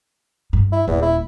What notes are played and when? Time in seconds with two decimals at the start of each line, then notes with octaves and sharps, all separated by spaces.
0.53 G2
0.73 E4
0.88 D#1 E2
1.02 E4